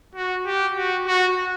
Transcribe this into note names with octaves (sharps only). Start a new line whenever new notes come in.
F#4
G4
F#4
F#4